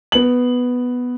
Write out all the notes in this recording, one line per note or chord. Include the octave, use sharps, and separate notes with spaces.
B3 F#7